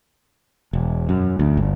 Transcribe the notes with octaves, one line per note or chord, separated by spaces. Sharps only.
E1
F#2
D2
G1